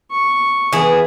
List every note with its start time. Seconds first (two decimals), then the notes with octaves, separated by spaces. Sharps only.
0.11 C#6
0.72 E3 B3 E4 G#4